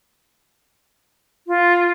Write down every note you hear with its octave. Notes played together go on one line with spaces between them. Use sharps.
F4